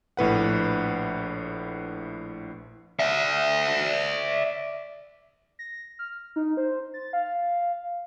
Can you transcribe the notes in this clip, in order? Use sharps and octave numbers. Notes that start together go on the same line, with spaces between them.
A#1 A2 B4 F#5
D5 E5
A#6
F6
D#4
C5
A6
F5